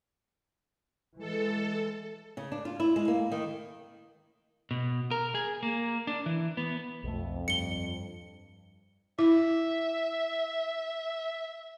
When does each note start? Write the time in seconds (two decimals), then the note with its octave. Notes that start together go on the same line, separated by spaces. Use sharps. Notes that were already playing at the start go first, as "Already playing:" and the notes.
1.19 E3 G#3 A4
2.37 C#3
2.52 D4
2.65 F4
2.80 E4
2.96 G#3
3.08 A#3
3.32 D#3
4.71 B2
5.11 A#4
5.35 G#4
5.63 A#3
6.07 D4
6.26 E3
6.57 B3
7.04 B1 F2 A3
7.48 G2 C#7 G7
9.19 E4 E5